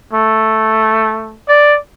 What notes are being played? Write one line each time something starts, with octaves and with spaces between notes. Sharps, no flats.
A3
D5